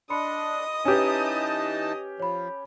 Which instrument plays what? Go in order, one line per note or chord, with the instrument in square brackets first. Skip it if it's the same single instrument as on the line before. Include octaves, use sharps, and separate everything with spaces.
[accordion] D4 [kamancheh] D#5 D#6 [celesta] B5 C6 C#7
[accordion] E3 D#4 A5 [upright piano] C#4 G4 [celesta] B4 G#5
[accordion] F3 [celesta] C#5 B5